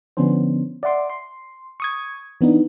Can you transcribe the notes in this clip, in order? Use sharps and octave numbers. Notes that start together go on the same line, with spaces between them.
D3 F3 B3 C#4 D4 C5
D5 E5 F#5 C6 D6
C6
C#6 D#6 G#6
E3 B3 D4 D#4